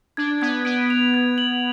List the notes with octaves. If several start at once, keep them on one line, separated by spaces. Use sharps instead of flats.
D4 G#6
B3 G#6
B3 D7
F7
G#6
F#7